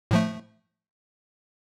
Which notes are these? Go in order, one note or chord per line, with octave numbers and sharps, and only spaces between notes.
A2 F3 A3